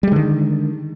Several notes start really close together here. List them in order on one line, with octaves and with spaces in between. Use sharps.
G3 G#3 D3 D#3